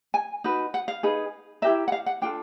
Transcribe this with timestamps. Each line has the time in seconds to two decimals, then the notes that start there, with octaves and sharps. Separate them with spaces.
0.14 G#5
0.44 D#4 F#4 B4
0.74 F#5
0.88 F5
1.03 D#4 G#4 B4
1.62 E4 G4 A#4 E5
1.88 F#5
1.92 F5
2.06 F#5
2.22 D4 F4 A4 G5